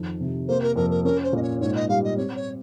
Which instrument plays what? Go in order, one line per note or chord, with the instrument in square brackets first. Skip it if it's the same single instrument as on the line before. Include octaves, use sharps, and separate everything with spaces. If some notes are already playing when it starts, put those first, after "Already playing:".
Already playing: [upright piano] F2 D#3
C3
[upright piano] A#3 [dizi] C5
[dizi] A#4
[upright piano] F2 [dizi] A#4
[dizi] A#4
[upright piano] C#4 [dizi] A#4
[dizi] C5
[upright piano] A#2 [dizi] D#5
[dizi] C#5
[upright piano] G#2 [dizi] C#5
[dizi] D#5
[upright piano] G3 [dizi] F5
[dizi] D#5
[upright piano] C4 [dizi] C#5
[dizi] C#5